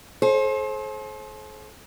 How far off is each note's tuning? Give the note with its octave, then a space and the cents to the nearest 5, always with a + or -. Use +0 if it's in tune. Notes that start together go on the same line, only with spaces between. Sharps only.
A4 -45 C5 +30